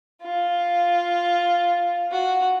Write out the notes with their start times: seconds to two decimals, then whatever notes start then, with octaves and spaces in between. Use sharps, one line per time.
0.23 F4
2.11 F#4